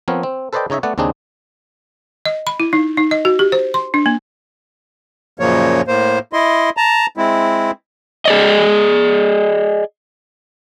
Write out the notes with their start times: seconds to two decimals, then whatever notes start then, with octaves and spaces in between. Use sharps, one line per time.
0.08 F3 B3 C4 A#4 C#5
0.23 C4
0.53 A4 B4 C5 D5 D#5 G5
0.70 C#3 D#4 C#5 D#5 E5
0.83 A3 B3 D5 F#5
0.98 D#2 C#3 C4 D4 D#4 G#4
2.26 D#5
2.47 B5
2.60 E4
2.73 D#4
2.97 D#4
3.11 D#5
3.25 F#4
3.39 G4
3.52 C5
3.74 C6
3.94 D4
4.06 A#3
5.40 F#2 A#2 C#3 F3 A#3 C#5
5.87 A2 A#3 C5
6.33 E4 D#5 C6
6.77 A5 A#5
7.17 G#3 C4 E4
8.25 G#4 D5 D#5